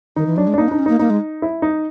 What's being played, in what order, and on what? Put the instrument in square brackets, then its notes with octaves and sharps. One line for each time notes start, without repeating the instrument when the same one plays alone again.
[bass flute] D#3 [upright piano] D#4
[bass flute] E3
[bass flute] F#3 [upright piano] D4
[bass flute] G#3
[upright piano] D4
[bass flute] A#3 [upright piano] D#4
[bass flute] D4
[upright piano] D#4
[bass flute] C#4
[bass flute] A#3 [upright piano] D#4
[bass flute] A#3 [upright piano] D#4
[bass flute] G#3
[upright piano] E4
D#4